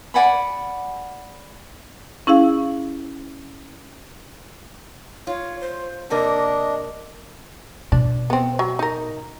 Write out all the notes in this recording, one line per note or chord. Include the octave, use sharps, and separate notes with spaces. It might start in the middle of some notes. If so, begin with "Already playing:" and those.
D5 F#5 G#5 B5
C#4 E4 G#4 F5
F4 C#5
C5
C3 A#3 D4 A#4 D#5
B2 D4
B3 C4
F#3
D#4 A#4